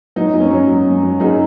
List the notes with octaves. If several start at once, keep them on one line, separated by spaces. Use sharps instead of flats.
F#3 D#4
F#2
C#4
F#3
F#3
F#2
F#3
F#2 D#4 G#4